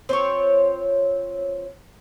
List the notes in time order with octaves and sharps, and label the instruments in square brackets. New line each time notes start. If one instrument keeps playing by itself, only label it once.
[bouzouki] C4 F4 C#5